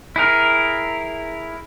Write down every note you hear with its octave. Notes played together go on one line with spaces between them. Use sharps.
E4 G#4 A#4